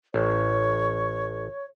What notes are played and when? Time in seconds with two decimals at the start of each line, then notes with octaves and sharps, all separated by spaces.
0.14 A1 C#5